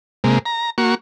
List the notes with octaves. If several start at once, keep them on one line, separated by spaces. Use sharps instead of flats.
C3 G#3 A#3
A#5
A#3 F#4 C#6